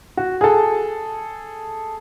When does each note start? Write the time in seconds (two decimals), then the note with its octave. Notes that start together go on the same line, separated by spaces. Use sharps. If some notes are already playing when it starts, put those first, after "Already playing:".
0.17 F#4
0.41 G#4 A4